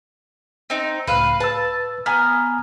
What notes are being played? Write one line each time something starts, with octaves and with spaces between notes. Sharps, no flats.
C4 D#4
C#2 A2 B4 F5
B4 A5 E6
B3 G#5 A#5 F6